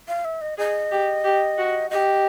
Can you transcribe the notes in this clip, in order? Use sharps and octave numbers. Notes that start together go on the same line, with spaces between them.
F5
E5
D#5
G#4 D#5
G4
G4
F#4
G4 D#5